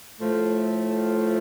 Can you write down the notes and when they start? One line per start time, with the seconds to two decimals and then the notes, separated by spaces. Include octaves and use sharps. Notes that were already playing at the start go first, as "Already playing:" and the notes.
0.20 A2 F3 A3